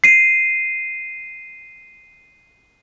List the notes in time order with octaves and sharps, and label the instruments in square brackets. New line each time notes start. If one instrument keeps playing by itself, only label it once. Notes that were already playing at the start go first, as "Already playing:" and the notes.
[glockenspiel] C7 D#7